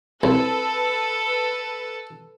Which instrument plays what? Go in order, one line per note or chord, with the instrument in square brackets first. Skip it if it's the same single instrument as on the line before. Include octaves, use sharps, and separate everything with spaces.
[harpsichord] C2 [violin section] A4 B4